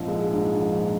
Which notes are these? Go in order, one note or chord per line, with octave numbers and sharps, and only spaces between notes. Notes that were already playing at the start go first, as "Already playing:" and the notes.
Already playing: A#1 G#2 F3 C4
G#3
G#2
A#1